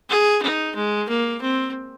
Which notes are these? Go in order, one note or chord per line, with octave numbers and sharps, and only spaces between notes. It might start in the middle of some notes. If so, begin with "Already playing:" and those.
G#4
D#4
G#3
A#3
C4